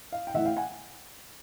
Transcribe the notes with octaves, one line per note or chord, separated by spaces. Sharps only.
F5
G5
A1 A2 E3 E5 F#5
F5 G5
F#5 G#5